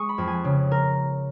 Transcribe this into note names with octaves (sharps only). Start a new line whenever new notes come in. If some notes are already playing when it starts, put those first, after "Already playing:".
Already playing: G#3 C#6 D#6
B5
F2
G#5
C#3
A#4